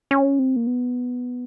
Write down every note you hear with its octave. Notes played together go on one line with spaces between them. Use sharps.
C#4
C4
A#3
B3